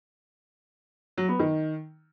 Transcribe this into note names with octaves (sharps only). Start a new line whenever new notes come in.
F#3
B3
D#3